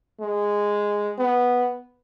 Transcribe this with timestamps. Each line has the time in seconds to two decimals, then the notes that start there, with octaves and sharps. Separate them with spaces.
0.20 G#3
1.18 B3